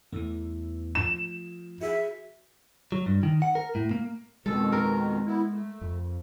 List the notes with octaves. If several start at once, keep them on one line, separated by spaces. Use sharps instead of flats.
E2 E3 A3
F3 E7
F#4 G#4 E5
F#3
G2
D#3
F#5
A#4
A2
A#3
F2 B2 D#3 G#3 A4
A#4
B3 E4
A3
F2